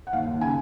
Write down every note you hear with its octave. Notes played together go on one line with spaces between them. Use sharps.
F#5
D#2 F5
D#2
C#3 G#5